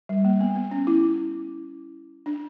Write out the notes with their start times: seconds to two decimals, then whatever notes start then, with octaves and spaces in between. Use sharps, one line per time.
0.09 G3
0.24 A#3
0.41 B3
0.55 B3
0.71 C#4
0.87 E4
2.26 D4